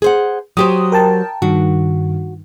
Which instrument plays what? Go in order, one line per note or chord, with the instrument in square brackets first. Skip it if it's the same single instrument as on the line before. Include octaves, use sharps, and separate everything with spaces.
[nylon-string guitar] G#4 C5 F#5
[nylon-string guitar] F#3 G4 C5 [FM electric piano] D#6
[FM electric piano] A#4 G5 A5
[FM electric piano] G2 D#3 [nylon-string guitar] F#4